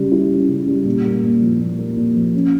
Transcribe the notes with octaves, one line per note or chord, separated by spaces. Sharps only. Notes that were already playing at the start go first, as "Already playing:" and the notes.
Already playing: C#3 G3 C#4
E4
C#4
C#3
G3
A#2
A#3
A#2
F3
A#2
A#3
A#2
F3
C#4